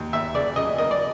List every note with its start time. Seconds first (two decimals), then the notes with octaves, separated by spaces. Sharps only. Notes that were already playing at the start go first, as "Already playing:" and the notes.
Already playing: D#2
0.13 D#2 E5
0.35 C#3 D5
0.56 C#3 D#5
0.78 A#3 D#5
0.91 D5